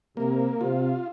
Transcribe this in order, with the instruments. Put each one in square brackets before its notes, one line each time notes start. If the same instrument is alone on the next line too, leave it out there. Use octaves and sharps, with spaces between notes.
[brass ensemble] C3 [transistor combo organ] A#3
[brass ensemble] C3 [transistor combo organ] F4